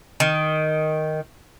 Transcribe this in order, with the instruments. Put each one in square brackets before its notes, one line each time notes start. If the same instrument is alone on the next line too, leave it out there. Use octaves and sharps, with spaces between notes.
[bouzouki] D#3